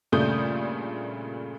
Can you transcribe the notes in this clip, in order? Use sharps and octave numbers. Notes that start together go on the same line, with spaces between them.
G2 A#2 C#3 A3 D#6 G6